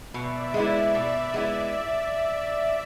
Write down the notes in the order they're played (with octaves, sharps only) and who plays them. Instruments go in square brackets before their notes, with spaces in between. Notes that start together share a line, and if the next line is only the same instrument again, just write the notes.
[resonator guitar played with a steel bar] B2 [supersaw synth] D5 E5
[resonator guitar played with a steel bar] G#3 B3 E4
B2
G#3 B3 E4